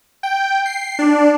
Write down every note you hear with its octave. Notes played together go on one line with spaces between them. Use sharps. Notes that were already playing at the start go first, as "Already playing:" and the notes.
G5
C7
D4